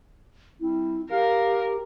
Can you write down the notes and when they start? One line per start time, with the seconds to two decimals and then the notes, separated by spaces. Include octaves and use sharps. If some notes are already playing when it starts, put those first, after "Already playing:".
0.60 G3 C4 E4
1.10 G4 A#4 F5